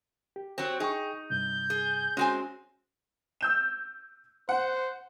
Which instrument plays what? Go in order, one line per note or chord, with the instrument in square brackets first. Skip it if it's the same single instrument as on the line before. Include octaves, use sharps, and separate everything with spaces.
[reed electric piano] G4
[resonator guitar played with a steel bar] F#3 C4
[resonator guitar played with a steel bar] D#4 [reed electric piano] G#4 G5 C#6
[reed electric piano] G2 C3 [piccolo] G6
[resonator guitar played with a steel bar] G#4
[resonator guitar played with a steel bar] G#3 C4 G#5 [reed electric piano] C#4 F#4
[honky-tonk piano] E6 G6 E7
[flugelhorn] C5 [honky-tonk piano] F#5